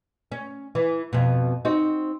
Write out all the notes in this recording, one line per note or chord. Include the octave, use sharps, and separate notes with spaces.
C#4
E3
F2 B2
C4 D#4 F#4